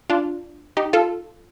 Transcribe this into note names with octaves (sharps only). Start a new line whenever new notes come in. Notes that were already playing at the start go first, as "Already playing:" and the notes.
D4 F4
D#4 G4
F4 A4